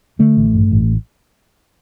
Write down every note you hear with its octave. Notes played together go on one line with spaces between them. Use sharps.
D3 A3
A1
G2
A1